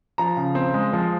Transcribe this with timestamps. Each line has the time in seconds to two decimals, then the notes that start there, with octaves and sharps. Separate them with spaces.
0.18 F3 A#5
0.37 C#3
0.55 C4
0.74 G#3
0.93 F3